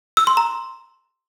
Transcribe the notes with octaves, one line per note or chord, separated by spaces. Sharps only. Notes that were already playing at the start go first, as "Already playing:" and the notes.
E6
C6
A#5